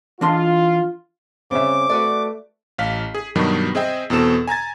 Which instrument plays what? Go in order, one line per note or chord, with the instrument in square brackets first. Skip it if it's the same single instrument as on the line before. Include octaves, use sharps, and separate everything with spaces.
[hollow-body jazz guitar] E3 D4 C6 [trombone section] F4
[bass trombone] C#3 [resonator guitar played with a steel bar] G3 [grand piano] C4 E5 [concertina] D6
[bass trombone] A3 [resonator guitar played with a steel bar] F#4 B4 D5
[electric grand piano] A1 F5 B6
G#4
G2 B2 D#3 F#3 G3
C4 G#4 D#5 E5 G5
E2 B2 C4 A4 E7
G#5 A#5 G#6 A6